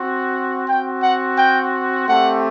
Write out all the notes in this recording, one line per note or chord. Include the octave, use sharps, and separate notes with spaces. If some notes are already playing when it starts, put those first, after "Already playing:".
Already playing: C4 F#4
C4 F#4 G5
F#5
G5
A3 C4 G4 F#5